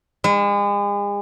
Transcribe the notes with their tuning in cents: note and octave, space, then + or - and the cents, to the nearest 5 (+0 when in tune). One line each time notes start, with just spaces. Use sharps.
G#3 -40